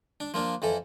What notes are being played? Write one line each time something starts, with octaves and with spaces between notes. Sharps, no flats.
D4
F3 A#3 D4
F2 E3 A4